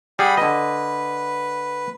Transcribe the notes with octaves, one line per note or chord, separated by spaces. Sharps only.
G3 G#4 F#5 B5
D3 B4 D#5